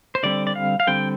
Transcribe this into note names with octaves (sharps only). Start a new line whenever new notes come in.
C5
D3 G3 C4 D5
D5
F5
F5
D3 G3 C4 G5